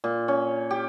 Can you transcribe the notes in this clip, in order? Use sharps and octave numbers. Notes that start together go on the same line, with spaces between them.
A#2
C#4
G4